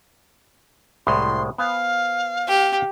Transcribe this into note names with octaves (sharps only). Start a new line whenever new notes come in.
C2 A2 G#3 C6
B3 C5 F5 G#5
G4